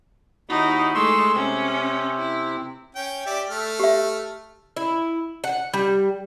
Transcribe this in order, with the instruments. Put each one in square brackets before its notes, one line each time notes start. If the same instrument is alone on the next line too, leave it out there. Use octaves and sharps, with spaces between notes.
[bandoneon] D#2 F#4 B5 [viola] D#4 E4
[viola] G#3 A3 [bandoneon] C6 C#6 E6
[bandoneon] C3 C4 [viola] C#4
[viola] E4
[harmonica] C#4 G5
G4 D5 E5
A3 F6
[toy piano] G4 E5
[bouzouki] E4
F#5
G3